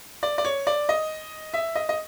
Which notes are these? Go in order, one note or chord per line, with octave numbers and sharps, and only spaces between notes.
D5
D5
C#5
D5
D#5
E5
D#5
D#5